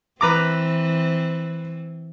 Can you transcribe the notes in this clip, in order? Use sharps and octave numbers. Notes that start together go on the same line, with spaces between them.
E3 C4 B4 A#5 D6